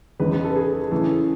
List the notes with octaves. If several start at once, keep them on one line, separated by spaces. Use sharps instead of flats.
E2 C#3 G#3 D#4 B4
B4
A4
G#4
C#3 E3 A3